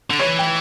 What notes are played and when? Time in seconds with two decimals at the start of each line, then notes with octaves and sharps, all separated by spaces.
0.10 D3
0.19 E3 C#5
0.39 G5